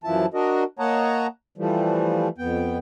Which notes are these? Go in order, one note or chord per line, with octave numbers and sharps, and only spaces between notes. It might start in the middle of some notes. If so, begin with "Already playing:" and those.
F#2 E3 F3 E4 A5
D4 F#4 A#4 D#5
A#3 C#5 D#5 F#5 A5 A#5
E3 F3 G3 A3
F2 B3 G5